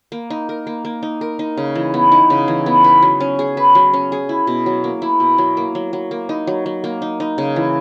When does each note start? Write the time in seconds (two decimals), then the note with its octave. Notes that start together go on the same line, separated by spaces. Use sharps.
0.12 A#3
0.30 D#4
0.49 A#4
0.67 A#3
0.85 A#3
1.03 D#4
1.21 A#4
1.39 D#4
1.57 C#3
1.75 E3
1.94 B3
2.12 D#4
2.30 C#3
2.48 E3
2.66 B3
2.84 B4
3.02 F#3
3.20 C#4
3.39 G#4
3.57 B4
3.75 F#3
3.94 C#4
4.12 G#4
4.29 E4
4.47 B2
4.66 F#3
4.84 A#3
5.02 E4
5.20 B2
5.38 F#3
5.57 A#3
5.75 F#3
5.93 F#3
6.11 A#3
6.29 D#4
6.47 F#3
6.66 F#3
6.84 A#3
7.02 D#4
7.20 D#4
7.38 C#3
7.56 E3